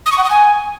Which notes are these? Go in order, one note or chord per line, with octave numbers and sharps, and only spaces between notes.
D#6
C#6
F#5
D#6
G#5